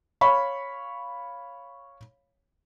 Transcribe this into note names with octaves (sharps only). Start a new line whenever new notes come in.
C#5 F5 B5 C#6